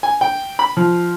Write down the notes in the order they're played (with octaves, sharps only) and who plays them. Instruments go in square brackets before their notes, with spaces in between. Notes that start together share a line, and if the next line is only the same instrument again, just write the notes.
[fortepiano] G#5
G5
B5
F3